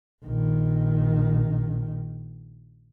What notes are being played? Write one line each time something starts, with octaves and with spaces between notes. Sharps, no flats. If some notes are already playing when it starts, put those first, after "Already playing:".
A#1 D#3